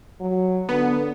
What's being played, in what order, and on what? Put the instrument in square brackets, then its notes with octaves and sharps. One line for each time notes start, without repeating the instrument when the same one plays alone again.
[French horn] F#3
[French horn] D3 [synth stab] B3